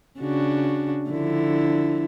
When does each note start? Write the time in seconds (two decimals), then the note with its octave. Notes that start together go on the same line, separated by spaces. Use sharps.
0.20 C#3 D4 F#4
1.09 D3 F3 E4